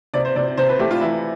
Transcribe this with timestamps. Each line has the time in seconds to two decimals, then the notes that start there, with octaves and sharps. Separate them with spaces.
0.14 C3 D5
0.25 C5
0.36 C3 D5
0.57 C3 C5
0.69 B4
0.79 A3 G4
0.91 F4
1.01 E3 E4